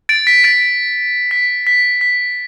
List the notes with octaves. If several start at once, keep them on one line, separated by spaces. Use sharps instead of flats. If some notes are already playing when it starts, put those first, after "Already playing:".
A6 D7
B6
A6 D7
B6
B6
B6